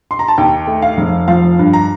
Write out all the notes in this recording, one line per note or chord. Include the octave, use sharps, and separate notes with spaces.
C6
A#5
A5
D#2 G5
A3
F5
F1
F3 F5
G2
A#5